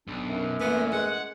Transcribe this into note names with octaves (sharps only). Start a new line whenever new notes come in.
B1 D4
F#2
A#2 E3 A3 B3 G#5
G#3 F#5